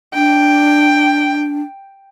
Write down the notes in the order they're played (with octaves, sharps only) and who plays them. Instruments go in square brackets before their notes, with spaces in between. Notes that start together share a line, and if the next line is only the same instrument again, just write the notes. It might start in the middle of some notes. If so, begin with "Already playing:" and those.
[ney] D4 [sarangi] G5